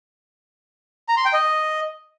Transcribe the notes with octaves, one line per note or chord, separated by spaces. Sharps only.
A#5
C6
G5
D#5